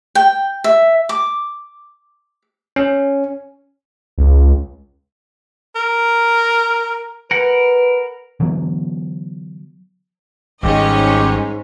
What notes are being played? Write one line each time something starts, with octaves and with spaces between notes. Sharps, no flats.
G5
E5
D6
C#4
C#2
A#4
A#4 B4 F#5
D3 E3 F#3 B3
G#1 G#2 G3 C#4 G4 C#5 D#5